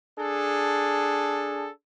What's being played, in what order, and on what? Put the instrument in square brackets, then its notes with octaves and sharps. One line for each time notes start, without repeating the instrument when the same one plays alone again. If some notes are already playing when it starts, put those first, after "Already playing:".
[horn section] D4 G#4 A4